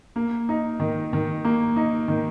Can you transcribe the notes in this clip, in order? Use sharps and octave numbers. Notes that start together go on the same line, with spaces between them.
A#3
D#4
D#3
D#3
A#3
D#4
D#3